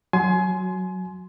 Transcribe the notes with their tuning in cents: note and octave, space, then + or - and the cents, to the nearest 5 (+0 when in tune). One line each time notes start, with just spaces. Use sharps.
F#3 +0 G#5 +30 C6 -5